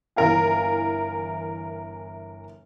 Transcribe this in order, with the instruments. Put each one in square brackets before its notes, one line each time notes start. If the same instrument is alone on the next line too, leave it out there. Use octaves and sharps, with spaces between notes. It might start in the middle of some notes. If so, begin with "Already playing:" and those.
[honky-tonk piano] G1 E3 A#4 F5 G#5